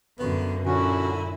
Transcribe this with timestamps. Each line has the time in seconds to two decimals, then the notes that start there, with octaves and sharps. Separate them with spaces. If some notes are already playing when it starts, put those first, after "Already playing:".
0.19 F#2 D3 A#3 B3
0.66 A#2 D3 C#4 E4 F#4